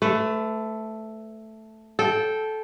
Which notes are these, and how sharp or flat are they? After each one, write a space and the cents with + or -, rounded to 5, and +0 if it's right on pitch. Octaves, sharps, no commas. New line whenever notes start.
A3 +0 B4 +35
A4 -15 G5 +0